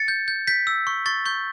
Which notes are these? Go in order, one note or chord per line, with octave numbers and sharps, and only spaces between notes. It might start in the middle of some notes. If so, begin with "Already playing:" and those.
Already playing: A6 C#7
G6
G6
G6 B6
E6
C#6
C#6 A6
C#6 G6